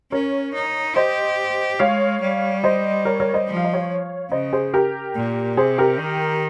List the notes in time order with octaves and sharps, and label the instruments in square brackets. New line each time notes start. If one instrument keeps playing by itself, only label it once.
[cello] C#4 [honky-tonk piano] A#4 C#5
[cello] D#4
[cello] G4 [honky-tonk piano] C5 D#5
[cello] G#3 [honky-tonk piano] C#5 F5
[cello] G3
[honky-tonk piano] C5 D#5
A#4 C#5
A#4 C#5
C5 D#5
[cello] F3
[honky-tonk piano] F5
D#5
C#5 F5
[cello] C#3 [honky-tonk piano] C5 D#5
[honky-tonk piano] G#4 C5
G4 A#4
[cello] A#2
[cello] C3 [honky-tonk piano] G#4 C5
[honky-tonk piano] G4 A#4
[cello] D#3